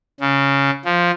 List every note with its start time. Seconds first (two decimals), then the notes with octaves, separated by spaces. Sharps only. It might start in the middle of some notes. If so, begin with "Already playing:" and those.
0.20 C#3
0.85 F3